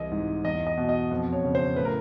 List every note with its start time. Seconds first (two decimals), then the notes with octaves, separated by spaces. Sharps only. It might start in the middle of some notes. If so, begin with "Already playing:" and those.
Already playing: C2 E3 D#5
0.11 G#2
0.44 E2 D#5
0.67 D#5
0.77 B2
0.89 D#5
1.11 F2
1.33 C#5
1.44 C#3
1.55 C5
1.76 A2 B4
1.85 A#4